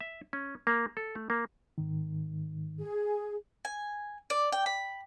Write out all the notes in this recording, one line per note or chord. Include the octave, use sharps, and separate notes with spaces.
E5
C#4
A#3
A4
A3
A#3
G#2 D#3
G#4
G#5
D5
G5
B5